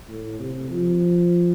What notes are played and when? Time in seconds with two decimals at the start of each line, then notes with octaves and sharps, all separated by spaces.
0.08 A2
0.39 C3
0.70 F3